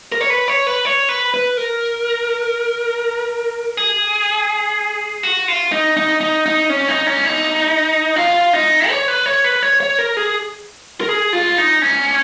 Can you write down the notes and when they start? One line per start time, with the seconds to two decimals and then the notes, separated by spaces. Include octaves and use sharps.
0.12 A#4
0.21 C#5
0.30 B4
0.48 C#5
0.67 B4
0.85 C#5
1.09 B4
1.34 B4
1.57 A#4
3.77 G#4
5.23 F#4
5.48 F4
5.72 D#4
5.97 D#4
6.21 D#4
6.46 D#4
6.70 C#4
6.88 D#4
7.07 C#4
7.25 D#4
8.16 F4
8.53 D#4
8.89 C#5
9.08 B4
9.26 C#5
9.44 B4
9.63 C#5
9.80 C#5
9.98 A#4
10.17 G#4
11.01 A#4
11.09 G#4
11.33 F4
11.58 D#4
11.82 C#4